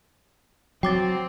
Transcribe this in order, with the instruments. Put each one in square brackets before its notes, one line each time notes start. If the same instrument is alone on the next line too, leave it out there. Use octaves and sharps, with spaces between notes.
[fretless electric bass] F#3 [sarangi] C4 [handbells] G5 D6 A6